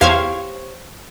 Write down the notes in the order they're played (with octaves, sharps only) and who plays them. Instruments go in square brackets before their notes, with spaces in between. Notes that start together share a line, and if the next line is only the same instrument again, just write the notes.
[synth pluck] E2 F5 G#6 [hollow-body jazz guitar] G4 C5 C#5